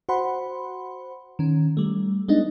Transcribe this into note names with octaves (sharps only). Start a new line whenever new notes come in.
F#4 C5 F#5 B5 C6
D#3 C#4
G3 A3
G#3 B3 D4 D#4 D#5